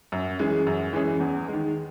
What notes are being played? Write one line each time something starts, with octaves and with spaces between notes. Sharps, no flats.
F#2
E3 G#3 C#4 G#4
F#2
E3 G#3 C#4 G#4
E2
D#3 G#3